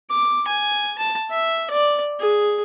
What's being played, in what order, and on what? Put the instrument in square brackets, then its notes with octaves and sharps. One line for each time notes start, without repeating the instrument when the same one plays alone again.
[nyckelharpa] D6
G#5
A5
E5
D5
G#4